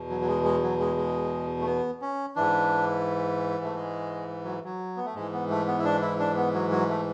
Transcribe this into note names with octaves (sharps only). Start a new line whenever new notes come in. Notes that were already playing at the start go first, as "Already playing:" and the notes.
Already playing: E2 B2
F#3
F#3
G#3
G#3
F#3
G#3
G#3
A3
B3
C#4
G#2 E3 D4
A3
G#3
F#3
F#3
B3
A3
G#2 E3 G#3
B3
A3
B3
E4
D4
E4
D4
B3
F#3
F#3
A3